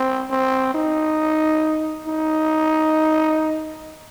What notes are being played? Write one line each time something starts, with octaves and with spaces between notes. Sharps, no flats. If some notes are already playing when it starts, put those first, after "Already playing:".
Already playing: C4
C4
D#4
D#4